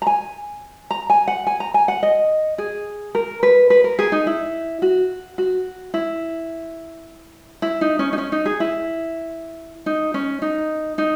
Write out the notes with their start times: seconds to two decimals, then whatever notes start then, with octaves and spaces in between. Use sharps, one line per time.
0.02 A#5
0.07 G#5
0.91 A#5
1.10 G#5
1.28 F#5
1.47 G#5
1.60 A#5
1.74 G#5
1.88 F#5
2.03 D#5
2.58 G#4
3.15 A#4
3.43 B4
3.70 B4
3.84 A#4
3.99 G#4
4.12 D#4
4.27 E4
4.82 F#4
5.38 F#4
5.94 E4
7.62 E4
7.81 D#4
7.99 C#4
8.13 D#4
8.18 C#4
8.32 D#4
8.46 G#4
8.60 E4
9.86 D#4
10.14 C#4
10.42 D#4
10.98 D#4